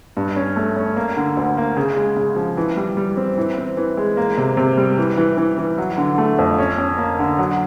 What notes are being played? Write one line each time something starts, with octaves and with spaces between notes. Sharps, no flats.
G2
C#4
A3
C#4
A#3
D3
D2
A#3
C#3
G#3
C#3
F3
E3
G3
G3
C4
E3
C4
E3
G#3
A#3
C3
C3
G3
E3
E3
E3
E3
F#3
D3
A3
F2
C#4
C#4
A#3
D3
F#3